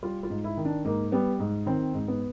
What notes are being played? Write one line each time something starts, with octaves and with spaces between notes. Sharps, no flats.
G3 F4
F4
G#2
E4
D#3
D4
G#2 A#3
G3 B3
G#2
D#3 C4
G#2
B3